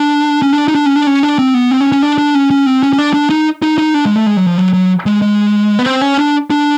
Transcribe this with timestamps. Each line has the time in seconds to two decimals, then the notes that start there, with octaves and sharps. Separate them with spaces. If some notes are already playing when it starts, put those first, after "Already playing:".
Already playing: D4
0.42 C#4
0.53 D4
0.68 D#4
0.75 D4
0.86 C#4
0.96 D4
1.07 C#4
1.23 D4
1.39 C4
1.54 B3
1.71 C4
1.81 C#4
1.92 C#4
2.02 D4
2.18 D4
2.35 C#4
2.51 C#4
2.66 C4
2.83 C#4
2.93 C#4
2.98 D4
3.14 D4
3.30 D#4
3.62 D#4
3.78 D#4
3.94 D4
4.05 G#3
4.16 A3
4.26 G#3
4.37 F#3
4.47 F3
4.58 F#3
4.73 F#3
5.06 G#3
5.22 G#3
5.79 B3
5.86 C4
6.01 C#4
6.18 D4
6.50 D4